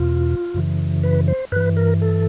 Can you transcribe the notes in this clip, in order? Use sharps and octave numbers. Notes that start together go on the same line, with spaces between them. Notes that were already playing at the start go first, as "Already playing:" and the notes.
Already playing: E2 B2 F4
F#2 C#3 E3
B4
C5
G2 E3 B4
A#4
A4